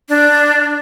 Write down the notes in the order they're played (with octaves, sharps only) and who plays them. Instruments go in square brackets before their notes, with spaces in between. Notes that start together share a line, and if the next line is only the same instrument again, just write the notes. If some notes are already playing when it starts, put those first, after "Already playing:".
[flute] D4